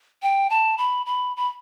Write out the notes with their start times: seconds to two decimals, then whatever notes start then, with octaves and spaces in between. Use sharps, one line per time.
0.23 G5
0.50 A5
0.78 B5
1.06 B5
1.37 B5